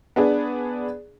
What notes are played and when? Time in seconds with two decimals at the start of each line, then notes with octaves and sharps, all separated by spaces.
0.16 B3 D4 G#4